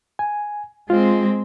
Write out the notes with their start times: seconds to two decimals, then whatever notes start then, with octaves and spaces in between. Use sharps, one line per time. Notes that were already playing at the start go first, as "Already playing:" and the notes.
0.19 G#5
0.90 G#3 C4 F4